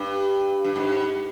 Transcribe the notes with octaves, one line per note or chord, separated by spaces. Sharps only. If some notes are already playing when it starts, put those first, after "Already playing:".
Already playing: G2
G2
G#2